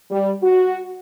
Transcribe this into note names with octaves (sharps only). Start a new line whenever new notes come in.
G3
F#4